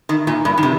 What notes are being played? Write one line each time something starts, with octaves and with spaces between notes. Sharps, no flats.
D#3
A#2
G2
D#3
C3